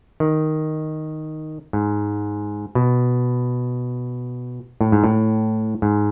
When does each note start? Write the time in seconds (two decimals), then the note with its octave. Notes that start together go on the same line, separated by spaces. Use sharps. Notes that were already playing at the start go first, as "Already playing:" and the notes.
0.20 D#3
1.73 G#2
2.75 B2
4.81 A2
4.92 G#2
5.04 A2
5.82 G#2